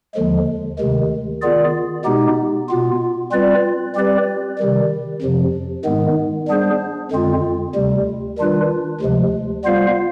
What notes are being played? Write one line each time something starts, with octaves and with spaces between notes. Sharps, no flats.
D#2 D3 F3 G#3
D2 C3 D#3 G#3
D#3 B3 F4 G#4 D5
B2 G#3 B3 D#4 G4
B2 B3 F4
G3 C4 F4 B4 D5
G3 C4 G4 B4 D5
C3 D#3 G3
F2 C3 F3
G#2 D#3 G#3 B3
G3 B3 D4 G#4 C5
F2 D3 G#3 C4 F4
D2 C3 G3
D#3 G3 D4 F4 B4
D2 C3 F3 G#3
G3 B3 F4 C5 F5